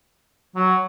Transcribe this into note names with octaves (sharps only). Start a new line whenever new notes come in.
F#3